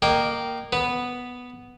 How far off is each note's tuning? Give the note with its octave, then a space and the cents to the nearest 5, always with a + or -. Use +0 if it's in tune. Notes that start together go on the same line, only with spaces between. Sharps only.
A#3 +0 D#5 -35 G5 -15
B3 +0 B4 +0